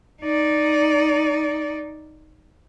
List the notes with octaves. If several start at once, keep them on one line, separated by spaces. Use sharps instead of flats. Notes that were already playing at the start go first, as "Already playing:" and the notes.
D#4 D5